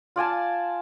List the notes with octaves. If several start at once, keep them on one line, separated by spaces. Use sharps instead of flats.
F4 D5 G#5 A5